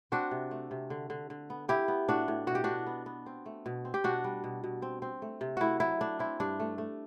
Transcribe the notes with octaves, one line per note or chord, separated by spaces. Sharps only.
C4 D4 F#4
C3
A3
C3
D3
D3
D3
B3
B3 E4 G4
B3
A2 D4 F#4
A2
B2 F#4
G4
B2 D4 F#4
B3
B3
C4
A3
B2
C4
G4
B2 D4 F#4
G3
B2
B2
C4
C4
A3
C3
A3 E4 F#4
F#3 E4
A3 D4
C4 E4
G2 D4
A3
A3